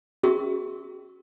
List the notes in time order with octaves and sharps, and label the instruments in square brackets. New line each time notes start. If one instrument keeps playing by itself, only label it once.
[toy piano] C#4 F#4 G#4 A#4 E5 C#6